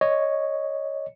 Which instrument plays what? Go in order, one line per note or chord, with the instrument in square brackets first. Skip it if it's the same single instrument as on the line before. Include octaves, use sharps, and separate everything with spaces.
[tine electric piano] C#5 D#5